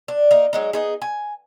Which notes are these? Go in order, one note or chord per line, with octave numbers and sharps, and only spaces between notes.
D4
A#3 D#4
F#3 G#3 D#4
B3 D#4 G#4
G#5